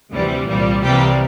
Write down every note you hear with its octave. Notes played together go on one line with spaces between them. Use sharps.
D2 C3 E3 G3
C2 A#2 G3
C2 C3 E3 G3 A#3 G4